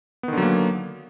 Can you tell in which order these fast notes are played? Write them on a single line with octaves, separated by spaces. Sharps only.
B3 D#3 D3 F#3 A#3